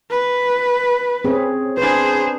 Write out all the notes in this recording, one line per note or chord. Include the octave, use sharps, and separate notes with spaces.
B4
C4 C#4 G#4
D4 G#4 B4 C5